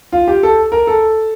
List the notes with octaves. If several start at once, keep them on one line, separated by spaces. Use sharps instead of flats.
F4
G4
A4
A#4
A4